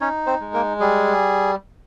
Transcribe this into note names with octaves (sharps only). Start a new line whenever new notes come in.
C#4 D#4 C#5
C4 C5
G#3
A#3 A#4
G3 G#4